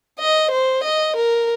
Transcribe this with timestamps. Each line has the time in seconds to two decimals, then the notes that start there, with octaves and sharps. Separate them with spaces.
0.20 D#5
0.51 C5
0.84 D#5
1.17 A#4